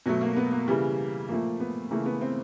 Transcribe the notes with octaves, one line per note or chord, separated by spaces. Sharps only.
B2 F#3 A3
A#3
B3
A#3
C#3 E3 G3
A#2 F3 A3 A#3
B3
C#3 E3 A3 A#3
B3
C4